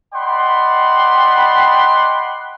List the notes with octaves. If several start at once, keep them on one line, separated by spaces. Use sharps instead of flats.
D5 D#5 F#5 G5 B5 C6